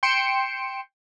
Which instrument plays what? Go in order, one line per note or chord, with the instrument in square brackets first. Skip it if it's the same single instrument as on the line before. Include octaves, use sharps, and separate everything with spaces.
[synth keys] G5 C6 C#7 D7 E7